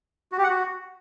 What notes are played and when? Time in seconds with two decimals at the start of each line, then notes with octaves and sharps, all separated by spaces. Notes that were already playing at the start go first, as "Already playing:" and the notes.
0.32 F#4
0.38 G4
0.44 F#5
0.50 F#4